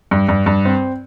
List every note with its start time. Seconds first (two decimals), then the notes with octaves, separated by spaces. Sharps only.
0.11 G2
0.29 G2
0.46 G2
0.65 C4